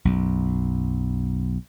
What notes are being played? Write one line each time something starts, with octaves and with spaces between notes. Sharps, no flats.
B1 F#2